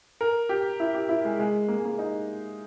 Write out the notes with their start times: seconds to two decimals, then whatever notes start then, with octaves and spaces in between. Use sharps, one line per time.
0.21 A#4
0.49 G4
0.80 E4
0.94 G4
1.09 E4
1.25 G#3
1.39 G#3
1.68 A#3
1.78 G#3
1.85 A#3
1.99 D#4